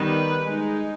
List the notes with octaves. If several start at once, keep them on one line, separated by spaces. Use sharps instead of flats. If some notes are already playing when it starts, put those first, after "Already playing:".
Already playing: D#3 G3 B3 D#4 B4
G#3 D#4